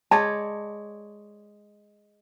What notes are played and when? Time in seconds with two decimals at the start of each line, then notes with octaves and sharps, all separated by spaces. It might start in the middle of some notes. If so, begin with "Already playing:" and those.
0.11 G#3 C#5 D5 A5